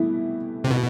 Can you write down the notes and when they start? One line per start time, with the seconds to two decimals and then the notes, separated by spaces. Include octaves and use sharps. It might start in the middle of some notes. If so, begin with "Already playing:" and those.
Already playing: B2 E3 G3 A3 B3 E4
0.64 C3
0.71 B2